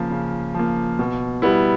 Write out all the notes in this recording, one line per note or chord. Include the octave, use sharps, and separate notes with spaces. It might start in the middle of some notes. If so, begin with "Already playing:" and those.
Already playing: C#3 F3 A#3
C#3
F3 A#3
B2
G3 B3 E4